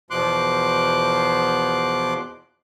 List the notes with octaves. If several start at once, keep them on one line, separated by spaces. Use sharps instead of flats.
E2 B2 F3 C6 D6 F#6